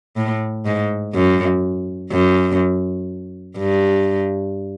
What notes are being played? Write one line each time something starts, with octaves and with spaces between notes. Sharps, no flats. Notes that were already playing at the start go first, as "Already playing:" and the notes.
A2
G#2
F#2
F#2
G2